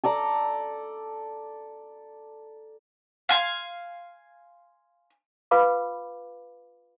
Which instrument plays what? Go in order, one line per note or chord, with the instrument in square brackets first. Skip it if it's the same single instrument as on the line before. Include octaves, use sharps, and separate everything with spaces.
[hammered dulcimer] A4 D5 A#5
[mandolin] F5 G#5 C6
[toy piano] F4 B4 F5 B5 D6